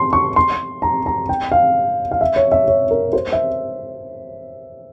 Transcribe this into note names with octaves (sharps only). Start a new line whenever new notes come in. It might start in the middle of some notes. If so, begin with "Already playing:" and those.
Already playing: C6
C#6
C6
A#5
A#5
G5
F5
F5
E5
C#5
E5
C#5
A#4
C5
E5